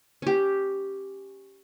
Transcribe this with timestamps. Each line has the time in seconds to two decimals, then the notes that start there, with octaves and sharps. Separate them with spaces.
0.22 C#4 G4